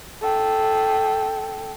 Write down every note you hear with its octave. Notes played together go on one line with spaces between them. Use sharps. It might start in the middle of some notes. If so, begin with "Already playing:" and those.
A4 G5